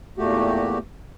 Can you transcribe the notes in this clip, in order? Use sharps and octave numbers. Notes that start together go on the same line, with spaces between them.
E2 A#2 A3 F#4 G4